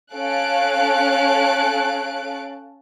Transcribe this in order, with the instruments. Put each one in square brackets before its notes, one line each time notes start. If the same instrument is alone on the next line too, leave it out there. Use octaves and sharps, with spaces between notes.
[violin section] C#4 A4 F5 A5 F#6 D7